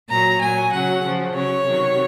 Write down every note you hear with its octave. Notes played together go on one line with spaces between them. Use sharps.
A#2 F#3 A#5
A#2 F#3 G#5
C#3 F#3 F#5
C#3 F3
C#3 F#3 C#5
C3 D#3 F#3